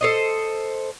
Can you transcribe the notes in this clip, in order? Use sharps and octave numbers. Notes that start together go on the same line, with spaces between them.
A4 C5 D#5